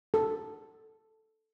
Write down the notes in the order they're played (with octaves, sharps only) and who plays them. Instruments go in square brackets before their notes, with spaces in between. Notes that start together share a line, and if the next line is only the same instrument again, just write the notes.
[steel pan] A4